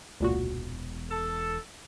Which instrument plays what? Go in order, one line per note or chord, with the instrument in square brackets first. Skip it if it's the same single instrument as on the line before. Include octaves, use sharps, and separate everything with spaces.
[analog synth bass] E1 [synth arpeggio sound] C#2 A#2 F#4
[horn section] A4